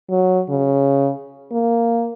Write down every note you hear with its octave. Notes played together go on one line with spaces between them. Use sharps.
F#3
C#3
A#3